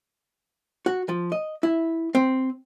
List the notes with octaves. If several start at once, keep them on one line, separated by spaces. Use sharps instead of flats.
F#4
F3
D#5
E4
C4